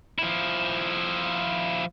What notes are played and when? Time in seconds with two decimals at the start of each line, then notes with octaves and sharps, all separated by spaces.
0.19 F3 E4